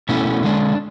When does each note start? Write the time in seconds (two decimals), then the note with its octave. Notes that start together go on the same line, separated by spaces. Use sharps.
0.09 B2 A3 C#4 E4
0.43 D3 G#3 D4